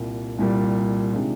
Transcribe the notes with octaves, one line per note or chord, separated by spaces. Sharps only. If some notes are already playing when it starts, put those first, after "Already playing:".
Already playing: C2 A#2 G3
C2 A#2 G3
C3 D#3 G#3 D4 F4